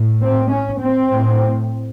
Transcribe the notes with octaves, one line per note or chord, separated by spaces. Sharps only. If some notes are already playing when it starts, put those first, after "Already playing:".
Already playing: A2
C4
C#4
C4
A2